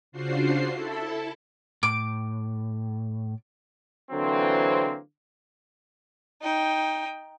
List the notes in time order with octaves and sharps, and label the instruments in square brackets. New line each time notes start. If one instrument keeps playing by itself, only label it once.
[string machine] C#3 D4 F4 F#4 C5 C7
E4 A4 A5
[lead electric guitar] A2 [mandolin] D6
[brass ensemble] D3 E3 F#3 A#3 C4
[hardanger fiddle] D#4 G5